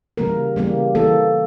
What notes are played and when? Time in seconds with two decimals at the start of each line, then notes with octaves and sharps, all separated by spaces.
0.17 C#3 E3 G3 A#3 A#4
0.56 C#3 E3 G3 A#3
0.95 E3 A#3 A4